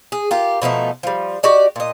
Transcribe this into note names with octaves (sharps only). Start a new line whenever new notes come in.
G#4
F4 G4 A#4
B2 F3 A3 D#4
F3 G3
F#4 G4 D5 D#5
A#2 D#5